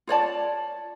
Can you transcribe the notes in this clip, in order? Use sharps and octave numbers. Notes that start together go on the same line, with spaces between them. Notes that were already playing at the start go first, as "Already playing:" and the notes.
F4 C#5 D5 A5